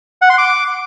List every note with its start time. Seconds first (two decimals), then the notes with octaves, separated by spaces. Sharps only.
0.22 F#5
0.30 C6
0.38 D6